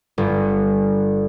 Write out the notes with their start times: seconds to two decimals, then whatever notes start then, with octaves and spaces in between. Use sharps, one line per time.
0.18 G1